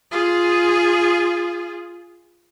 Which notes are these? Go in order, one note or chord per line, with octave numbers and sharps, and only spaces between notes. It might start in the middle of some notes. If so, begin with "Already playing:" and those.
F4 G#4